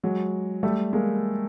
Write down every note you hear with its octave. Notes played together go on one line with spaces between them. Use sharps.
F#3 G#3
G3 A3
G#3 A#3